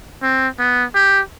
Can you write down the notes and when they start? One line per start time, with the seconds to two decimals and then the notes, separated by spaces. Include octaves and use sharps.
0.23 C4
0.59 B3
0.95 G4